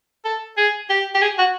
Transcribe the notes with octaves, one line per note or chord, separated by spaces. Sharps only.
A4
G#4
G4
G4
G#4
F#4